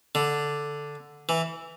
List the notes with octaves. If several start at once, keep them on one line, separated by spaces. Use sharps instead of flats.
D3
E3